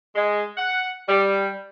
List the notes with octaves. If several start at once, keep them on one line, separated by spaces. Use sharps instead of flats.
G#3
F#5
G3